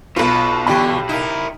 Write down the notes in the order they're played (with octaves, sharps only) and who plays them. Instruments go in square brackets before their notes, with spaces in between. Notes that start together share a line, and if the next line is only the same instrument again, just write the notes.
[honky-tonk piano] B1 F4 [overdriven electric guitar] B2 [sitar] B4
[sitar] G2 D3 E3 [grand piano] G4 B5
[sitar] D#4 [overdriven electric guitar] E4 A#4